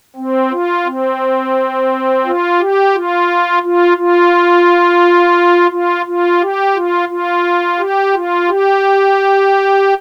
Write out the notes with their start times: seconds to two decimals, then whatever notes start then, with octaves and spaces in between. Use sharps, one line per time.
0.16 C4
0.51 F4
0.86 C4
2.25 F4
2.59 G4
2.94 F4
3.63 F4
3.97 F4
5.71 F4
6.06 F4
6.41 G4
6.75 F4
7.09 F4
7.79 G4
8.14 F4
8.48 G4